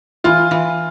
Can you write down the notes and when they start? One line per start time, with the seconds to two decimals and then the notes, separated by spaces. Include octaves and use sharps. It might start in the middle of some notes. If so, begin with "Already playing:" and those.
0.24 E3 F4
0.51 E3